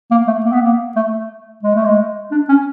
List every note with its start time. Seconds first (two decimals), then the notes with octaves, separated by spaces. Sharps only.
0.11 A#3
0.27 A3
0.45 A#3
0.52 B3
0.61 A#3
0.96 A3
1.63 G#3
1.75 A3
1.85 G#3
2.31 D4
2.49 C#4